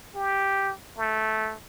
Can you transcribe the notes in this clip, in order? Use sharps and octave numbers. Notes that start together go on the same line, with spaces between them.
G4
A3